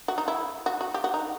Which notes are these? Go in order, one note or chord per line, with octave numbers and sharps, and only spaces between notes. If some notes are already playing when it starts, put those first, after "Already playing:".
F#4
D#4
E4
F#4
F#4
G4
F#4
D#4